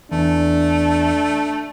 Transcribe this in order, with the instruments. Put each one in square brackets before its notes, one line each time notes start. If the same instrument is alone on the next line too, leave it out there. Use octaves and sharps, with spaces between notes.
[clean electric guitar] E2 [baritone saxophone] A3 [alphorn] D4